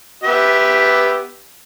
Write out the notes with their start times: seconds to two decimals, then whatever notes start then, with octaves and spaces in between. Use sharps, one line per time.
0.23 B3 G4 E5